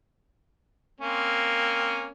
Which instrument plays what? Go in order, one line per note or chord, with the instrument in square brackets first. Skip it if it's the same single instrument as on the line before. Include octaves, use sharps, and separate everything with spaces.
[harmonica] A#3 C4 C#4